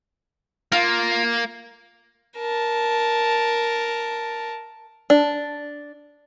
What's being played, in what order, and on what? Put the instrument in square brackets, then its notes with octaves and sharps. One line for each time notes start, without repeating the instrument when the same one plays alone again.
[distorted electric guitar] A#3 [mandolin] F4
[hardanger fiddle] A#4 A5
[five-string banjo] D4